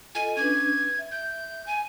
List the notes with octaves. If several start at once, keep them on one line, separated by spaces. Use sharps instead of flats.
F4 A4 D#5 G#5
C#4 D4 B4 G#6
E5
G6
G#5